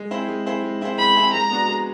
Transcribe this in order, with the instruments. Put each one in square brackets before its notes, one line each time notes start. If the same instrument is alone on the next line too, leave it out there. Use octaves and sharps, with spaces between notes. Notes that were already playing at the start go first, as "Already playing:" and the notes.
Already playing: [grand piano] G#3
C4 E4 G#4 C5
G#3
C4 E4 G#4 C5
G#3
C4 E4 G#4 C5
[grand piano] G#3 [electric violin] B5
[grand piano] C4 E4 G#4 C5
[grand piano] G#3 [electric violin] A#5
[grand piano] B3 D4 F#4
G#3